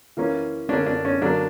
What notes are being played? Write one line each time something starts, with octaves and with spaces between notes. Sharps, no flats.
E3 A#3 C#4
D3 A#3 C#4 D4
D4
C#4
D3 F#3 A#3 D4